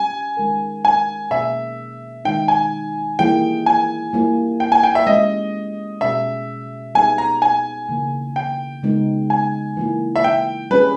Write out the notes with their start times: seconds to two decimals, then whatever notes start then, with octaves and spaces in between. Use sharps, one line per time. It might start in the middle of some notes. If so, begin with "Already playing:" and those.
Already playing: G3 C#4 G4 G#5
0.37 D#3 G#3 D#4 A#4
0.85 G#5
1.31 B2 A#3 C#4 G#4 E5
2.25 D#3 G#3 D#4 G5
2.48 G#5
3.19 E3 G3 A#3 E4 G#4 G5
3.66 G#5
4.13 G3 A#3 E4
4.60 G5
4.72 G#5
4.83 G5
4.95 E5
5.07 G#3 C#4 G4 D#5
6.01 B2 G3 C#4 G#4 E5
6.95 G3 B3 D#4 G#4 G#5
7.18 A#5
7.42 G#5
7.89 C#3 E3 A#3
8.36 G5
8.83 C#3 G#3 B3 D#4
9.30 G#5
9.77 E3 A#3 E4
10.16 E5
10.24 G5
10.71 G3 C#4 G#4 B4